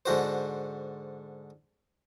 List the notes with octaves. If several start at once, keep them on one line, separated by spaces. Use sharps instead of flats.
G#2 D3 F#4 C5